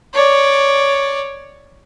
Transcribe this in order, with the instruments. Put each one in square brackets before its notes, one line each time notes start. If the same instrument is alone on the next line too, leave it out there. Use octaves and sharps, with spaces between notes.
[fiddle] C#5 D5